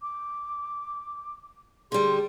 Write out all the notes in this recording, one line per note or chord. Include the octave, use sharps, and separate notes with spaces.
D6
D3 G3 G#4 C6